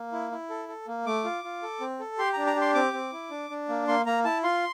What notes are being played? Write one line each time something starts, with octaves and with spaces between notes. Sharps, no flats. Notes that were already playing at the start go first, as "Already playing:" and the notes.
Already playing: A#3
E4
E4
A4
A4
A#3
A3 D6
F4
F4
A4
C4
A4
G4 C6
A#5
D4
A#5
G4
C6
C4 D6
C4
E4
D4
D4
A#3
A#3 C6
A#3 A#5
E4 A5
F4 C6